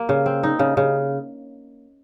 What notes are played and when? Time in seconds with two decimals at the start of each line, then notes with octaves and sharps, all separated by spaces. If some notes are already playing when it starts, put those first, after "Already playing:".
Already playing: A#3
0.09 C#3
0.26 C4
0.43 D#4
0.59 C#3
0.77 C#3